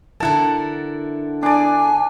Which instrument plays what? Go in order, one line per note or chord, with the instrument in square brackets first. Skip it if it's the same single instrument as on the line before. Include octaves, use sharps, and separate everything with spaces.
[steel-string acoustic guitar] D3 E4 A#4 [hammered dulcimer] F#5 A5
[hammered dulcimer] D4 D5 [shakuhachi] G#5